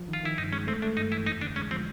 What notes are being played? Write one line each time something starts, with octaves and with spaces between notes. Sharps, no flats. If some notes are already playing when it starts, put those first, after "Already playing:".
Already playing: F3
D#3 F4
D#3 E4
G2 D#4
G#3 C#4
A3 C4
A3 D4
G2 D#4
E3 E4
F2 D#4
D3 D4
G#3 C#4
F3 C4